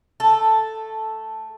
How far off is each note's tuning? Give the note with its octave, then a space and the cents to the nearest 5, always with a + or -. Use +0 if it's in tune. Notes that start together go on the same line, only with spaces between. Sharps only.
A3 +0 A4 +0